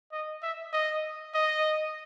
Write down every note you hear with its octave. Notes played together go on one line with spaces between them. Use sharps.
D#5
E5
D#5
D#5